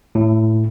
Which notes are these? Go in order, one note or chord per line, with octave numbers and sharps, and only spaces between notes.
A2